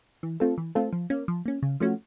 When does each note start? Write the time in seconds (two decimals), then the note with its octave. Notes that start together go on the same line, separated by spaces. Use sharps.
0.23 E3
0.40 A3 C4 F4 A4
0.58 E3
0.75 A3 C4 F4 A4
0.93 F3
1.10 A#3 C#4
1.28 F3
1.46 A#3 C#4
1.63 C#3
1.80 F3 A3 C#4 F#4